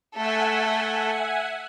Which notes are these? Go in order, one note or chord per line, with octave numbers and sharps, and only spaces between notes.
A3 A4 E5 F#5 G#5